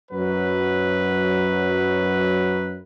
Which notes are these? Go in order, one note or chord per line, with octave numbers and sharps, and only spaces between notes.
F#2 F#3 B4